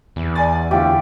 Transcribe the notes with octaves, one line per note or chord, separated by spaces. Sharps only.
E2
D5 G#5 A6
D2 E4 F4 G4